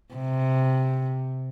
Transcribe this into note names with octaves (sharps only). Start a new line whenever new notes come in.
C3